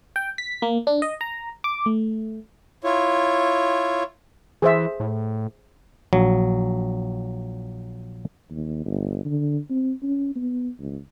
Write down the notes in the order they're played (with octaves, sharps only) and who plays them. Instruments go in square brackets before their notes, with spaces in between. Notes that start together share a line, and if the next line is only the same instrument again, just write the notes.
[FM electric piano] G5
B6
A#3
D4
D#5
A#5
D6
A3
[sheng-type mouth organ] E4 F4 C#5
[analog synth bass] E3 [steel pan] G#4 C5 E5
[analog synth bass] A2
[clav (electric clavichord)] A#1 F#3
[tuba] D#2
G1
D3
C4
C#4
B3
C#2